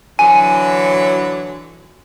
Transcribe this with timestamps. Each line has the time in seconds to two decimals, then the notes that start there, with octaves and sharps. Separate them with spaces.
0.19 D3 E3 F#3 G#5